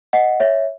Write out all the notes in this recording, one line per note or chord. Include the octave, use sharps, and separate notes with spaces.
D#5 F#5
C#5 E5